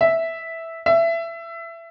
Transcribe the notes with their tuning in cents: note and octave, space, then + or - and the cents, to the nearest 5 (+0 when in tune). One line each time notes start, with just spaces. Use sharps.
E5 -5
E5 +20